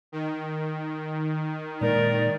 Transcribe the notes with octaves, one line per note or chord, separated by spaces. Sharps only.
D#3
A#2 G#3 A#4 D5